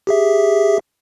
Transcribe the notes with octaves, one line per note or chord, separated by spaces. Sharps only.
G4 G#4 E5